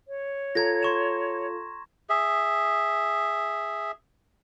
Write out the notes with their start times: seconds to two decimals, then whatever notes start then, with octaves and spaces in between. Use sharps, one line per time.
0.08 C#5
0.55 F4 A4 A#5 G#6 A#6
0.83 C6 C#6 E7
2.10 G#4 E5